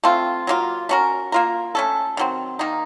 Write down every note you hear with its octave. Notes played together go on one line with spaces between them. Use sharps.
A3 C4 F4
F#3 A#3 F4
A3 C#4 F#4 A#4
A#3 F4 A#4
A3 C#4 A4
D#3 F#3 C4
D#3 A#3 D#4